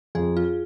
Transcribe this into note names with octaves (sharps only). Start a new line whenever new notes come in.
F2 G#4
F4